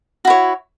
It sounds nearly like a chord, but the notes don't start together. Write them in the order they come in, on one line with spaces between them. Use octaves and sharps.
F#4 E4 C#5